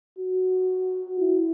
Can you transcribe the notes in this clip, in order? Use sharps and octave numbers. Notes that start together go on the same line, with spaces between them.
F#4
E4